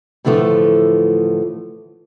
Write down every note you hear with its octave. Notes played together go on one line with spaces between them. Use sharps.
A2 D3 E3 F3 A3